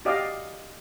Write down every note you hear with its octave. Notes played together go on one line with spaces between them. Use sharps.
F#4 G4 D5 D#5 F5